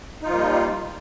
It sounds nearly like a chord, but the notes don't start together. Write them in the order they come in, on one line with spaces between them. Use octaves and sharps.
D#4 F4 F3 A#3 G3